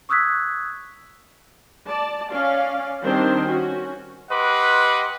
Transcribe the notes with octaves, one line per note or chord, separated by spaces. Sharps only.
C#6 D#6 E6 F#6 G#6 B6
D5 A5
C#4 D5 F5
D#3 G3 C4 D4 C5
C#4 F#4
G4 B4 D#5 F#5 C6 D6